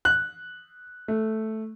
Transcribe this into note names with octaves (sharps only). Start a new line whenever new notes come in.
F#6
A3